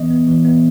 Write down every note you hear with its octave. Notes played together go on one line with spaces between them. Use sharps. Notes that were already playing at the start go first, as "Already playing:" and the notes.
Already playing: E3 B3 D#5
B3
E3
B3